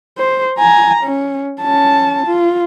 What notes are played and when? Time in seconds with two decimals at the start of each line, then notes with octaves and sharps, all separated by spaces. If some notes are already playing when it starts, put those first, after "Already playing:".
0.18 C5
0.58 G#5 A#5
1.04 C#4
1.61 C#4 A5
2.27 F4